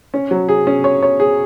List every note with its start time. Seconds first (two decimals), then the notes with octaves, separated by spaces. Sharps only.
0.14 C#4
0.31 F#3
0.49 G#4
0.67 C#4
0.84 C#5
1.03 C#5
1.20 G#4